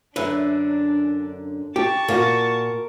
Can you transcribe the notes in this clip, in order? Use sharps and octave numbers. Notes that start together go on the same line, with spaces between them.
F#2 D3 D4 B4 E5
G4 A5 C#6
A#2 F4 F#4 A#4